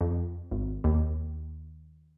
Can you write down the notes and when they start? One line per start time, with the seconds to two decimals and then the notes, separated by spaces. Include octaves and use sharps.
0.01 F2
0.51 G#1
0.84 D#2